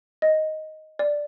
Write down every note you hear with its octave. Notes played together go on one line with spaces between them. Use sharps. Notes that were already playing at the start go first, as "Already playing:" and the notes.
D#5
D5